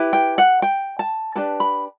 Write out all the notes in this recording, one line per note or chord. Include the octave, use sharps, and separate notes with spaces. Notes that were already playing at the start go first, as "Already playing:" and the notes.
Already playing: E4 G4 B4
G5
F#5
G5
A5
D4 G4 B4 A5
B5